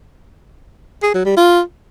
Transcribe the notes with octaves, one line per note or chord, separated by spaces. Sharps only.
G#4
F#3
G3
F4